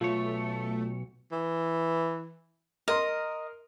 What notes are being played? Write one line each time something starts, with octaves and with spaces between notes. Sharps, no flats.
B1 A3 F4 C#5
E3
A#4 D#5 C6